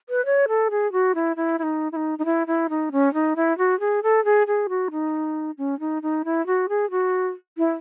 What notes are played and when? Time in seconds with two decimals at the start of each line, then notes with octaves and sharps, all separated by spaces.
0.09 B4
0.25 C#5
0.48 A4
0.70 G#4
0.92 F#4
1.15 E4
1.36 E4
1.59 E4
1.63 D#4
1.92 E4
1.96 D#4
2.18 D#4
2.25 E4
2.47 E4
2.69 D#4
2.92 C#4
3.14 D#4
3.36 E4
3.58 F#4
3.80 G#4
4.03 A4
4.25 G#4
4.47 G#4
4.69 F#4
4.91 D#4
5.58 C#4
5.80 D#4
6.02 D#4
6.25 E4
6.46 F#4
6.69 G#4
6.91 F#4
7.57 E4